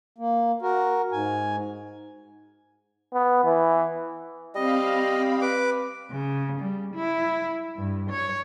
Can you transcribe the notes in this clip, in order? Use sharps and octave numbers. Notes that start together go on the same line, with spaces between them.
A#3
F#4 A#4
G#2 G#5
B3
E3
G3 C4 D#5 F5 B5
B4 D6
C#3
G3
E4
G2
C#5